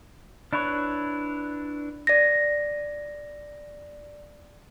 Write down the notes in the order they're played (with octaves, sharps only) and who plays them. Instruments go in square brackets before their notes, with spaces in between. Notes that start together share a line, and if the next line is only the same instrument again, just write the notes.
[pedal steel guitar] D4 E4 B4 C#5
[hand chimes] D5 A#6